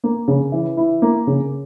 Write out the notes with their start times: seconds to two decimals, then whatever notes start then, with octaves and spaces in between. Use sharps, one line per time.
0.04 A#3
0.28 C#3
0.52 E3
0.77 E4
1.02 A#3
1.27 C#3